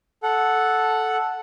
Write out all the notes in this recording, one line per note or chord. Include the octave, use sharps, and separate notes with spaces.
A4 F#5